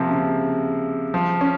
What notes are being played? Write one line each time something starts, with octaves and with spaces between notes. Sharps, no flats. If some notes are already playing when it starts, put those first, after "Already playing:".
Already playing: C3 F3 A#3
C#3
F3
C#4